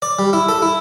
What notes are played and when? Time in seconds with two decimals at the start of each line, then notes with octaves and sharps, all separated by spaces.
0.02 D5
0.19 G3
0.33 E4
0.49 A4
0.62 E4